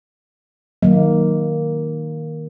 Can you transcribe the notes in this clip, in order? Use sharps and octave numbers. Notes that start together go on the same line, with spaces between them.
D#3 F#3 A#3